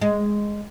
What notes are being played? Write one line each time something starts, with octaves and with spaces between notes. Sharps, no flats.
G#3